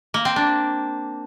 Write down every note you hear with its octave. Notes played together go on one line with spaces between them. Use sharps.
A#3
C4
D4